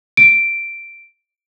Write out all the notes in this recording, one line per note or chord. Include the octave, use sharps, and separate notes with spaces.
D7